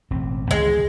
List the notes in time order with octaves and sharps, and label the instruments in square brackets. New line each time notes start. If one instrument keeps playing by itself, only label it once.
[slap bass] E1 A1 C4
[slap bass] C#2 D#3 E3 [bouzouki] G#3